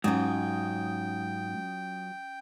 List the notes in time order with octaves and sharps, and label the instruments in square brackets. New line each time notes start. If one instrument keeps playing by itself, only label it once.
[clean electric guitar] G#2 [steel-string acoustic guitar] F#3 F4 [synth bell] C#4 D#6 [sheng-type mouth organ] G5